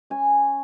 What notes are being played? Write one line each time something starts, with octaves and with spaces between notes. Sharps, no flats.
C#4 G#5